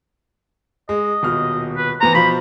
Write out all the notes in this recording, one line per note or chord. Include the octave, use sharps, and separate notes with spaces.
G#3 D#5
D#1 B2 F6
B4
E3 B3 C5 A#5
B2 F3 C5 B5